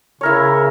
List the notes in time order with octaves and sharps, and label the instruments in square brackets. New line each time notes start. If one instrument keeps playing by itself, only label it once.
[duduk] C#3 [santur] E4 A#4 C#5